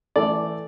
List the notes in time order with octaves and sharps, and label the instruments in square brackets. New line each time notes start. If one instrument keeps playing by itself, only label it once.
[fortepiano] E3 A3 D5